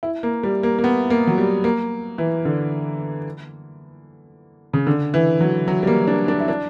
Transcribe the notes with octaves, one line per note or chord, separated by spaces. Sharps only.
E4
A#3
G3
A#3
A#3
B3
A#3
F#3
G3
A#3
E3
D3
C#3
D3
E3
F#3
F#3
G3
A#3
D4
D4
E4
D4